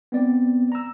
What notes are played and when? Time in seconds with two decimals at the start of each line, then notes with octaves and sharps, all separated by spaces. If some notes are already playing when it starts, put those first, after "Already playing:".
0.12 B3 C4 D5
0.72 A#5 E6